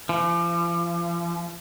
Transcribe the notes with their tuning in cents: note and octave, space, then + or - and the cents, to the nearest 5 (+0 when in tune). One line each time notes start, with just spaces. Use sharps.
F3 -40